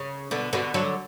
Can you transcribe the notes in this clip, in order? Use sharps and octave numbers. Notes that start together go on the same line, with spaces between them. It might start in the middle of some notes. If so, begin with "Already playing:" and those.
Already playing: C#3
B2 D3
B2 D3
D3 F#3